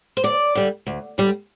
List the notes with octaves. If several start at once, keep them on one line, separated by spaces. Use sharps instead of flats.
C5
D2 D5
D3 G3
D2
D3 G3